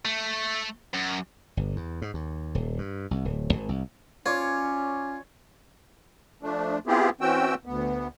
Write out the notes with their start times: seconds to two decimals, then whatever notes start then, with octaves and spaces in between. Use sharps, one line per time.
0.05 A3
0.93 F#2
1.57 G1
1.76 E2
2.02 G#2
2.14 D#2
2.55 D#1
2.78 G2
3.11 C2
3.25 D1
3.53 G#1
3.69 C2
4.26 C#4 F4 C#5 D5
6.43 F3 A3 D4
6.87 B3 C4 E4 F4 G4 G#4
7.21 E3 C4 C#4 F#4 G5 E6
7.66 D2 B3